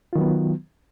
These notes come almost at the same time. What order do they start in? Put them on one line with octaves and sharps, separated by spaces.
F4 D#3 F#3 B3